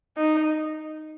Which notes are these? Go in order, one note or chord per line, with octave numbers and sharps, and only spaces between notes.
D#4